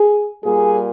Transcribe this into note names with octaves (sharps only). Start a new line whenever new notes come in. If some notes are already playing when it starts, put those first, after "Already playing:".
Already playing: G#4
A#2 G3 G#4